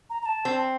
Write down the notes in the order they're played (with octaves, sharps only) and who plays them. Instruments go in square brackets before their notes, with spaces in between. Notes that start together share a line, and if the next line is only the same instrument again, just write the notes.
[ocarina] A#5
A#5
A5
[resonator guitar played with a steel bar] C4